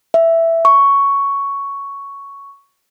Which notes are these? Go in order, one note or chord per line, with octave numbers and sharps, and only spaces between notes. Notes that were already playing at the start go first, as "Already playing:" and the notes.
E5
C#6